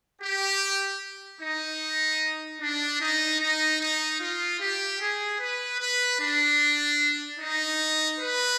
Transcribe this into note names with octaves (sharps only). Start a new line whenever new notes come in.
G4
D#4
D4
D#4
D#4
D#4
F4
G4
G#4
B4
B4
D4
D#4
B4